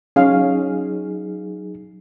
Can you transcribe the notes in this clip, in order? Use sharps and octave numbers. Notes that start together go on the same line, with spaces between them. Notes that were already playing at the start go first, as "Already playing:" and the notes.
F#3 C#4 D#4 G#4 F5